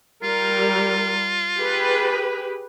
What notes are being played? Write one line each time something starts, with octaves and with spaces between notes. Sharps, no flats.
G3 F4 A#4
G4 G#4 B4